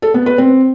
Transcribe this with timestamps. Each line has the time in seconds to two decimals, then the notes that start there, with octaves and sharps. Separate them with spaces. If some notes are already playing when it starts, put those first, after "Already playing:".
0.02 A4
0.14 B3
0.26 B4
0.38 C4